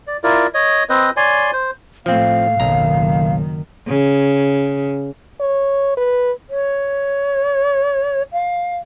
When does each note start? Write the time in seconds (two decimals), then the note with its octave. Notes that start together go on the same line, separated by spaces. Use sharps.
0.07 D5
0.24 E4 F4 A#4 D5
0.54 C#5 D#5
0.89 C4 B4 C5 D#5
1.17 C#5 D5 G#5 C6
1.53 C5
2.06 A2 F3 A3 C4 F5
2.60 F#1 B1 D#3 A#5
3.88 C#3
5.40 C#5
5.97 B4
6.50 C#5
8.32 F5